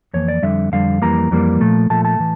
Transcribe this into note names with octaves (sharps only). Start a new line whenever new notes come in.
F2 E3 A#3 C#5
D5
F2 D3 G3 E5
F2 D3 G3 F5
F2 E3 G3 A#3 A#5
F2 E3 G3 A#3
A#2 F3 A3
A#2 F3 A3 A5
A5
A2 E3